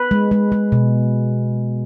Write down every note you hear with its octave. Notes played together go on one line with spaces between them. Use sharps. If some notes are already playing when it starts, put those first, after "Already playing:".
Already playing: B4
G#3
G#3
G#3
B2